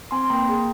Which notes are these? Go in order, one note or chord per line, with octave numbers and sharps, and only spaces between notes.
C4 G#5 C6
C6
A#3 G5 A#5
G#4